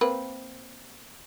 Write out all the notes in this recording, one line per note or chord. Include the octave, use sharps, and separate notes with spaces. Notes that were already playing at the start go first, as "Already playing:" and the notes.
A#3 C4 B4